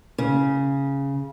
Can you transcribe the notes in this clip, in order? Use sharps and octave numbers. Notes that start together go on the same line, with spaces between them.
C#3